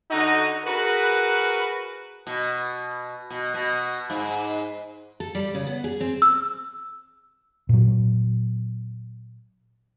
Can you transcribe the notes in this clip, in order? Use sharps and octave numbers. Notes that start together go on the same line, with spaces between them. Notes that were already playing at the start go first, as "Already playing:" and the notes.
D3 D#4 F#4
F#4 G#4 A#4 B4
B2
B2
B2
G#2
A4
G3
C#3
B3
G#4
C4
E6
A#2 F#3